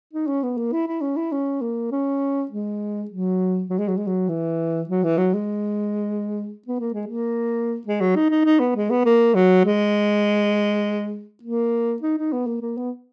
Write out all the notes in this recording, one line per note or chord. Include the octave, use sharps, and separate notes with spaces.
D#4
C#4
B3
A#3
E4
E4
C#4
E4
C#4
A#3
C#4
G#3
F#3
F#3
G#3
F#3
G#3
F#3
E3
F#3
E3
F#3
G#3
B3
A#3
G#3
A#3
G#3
F#3
D#4
D#4
D#4
B3
G#3
B3
A#3
F#3
G#3
A#3
D#4
D#4
B3
A#3
A#3
B3